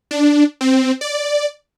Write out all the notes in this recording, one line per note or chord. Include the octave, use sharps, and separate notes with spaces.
D4
C4
D5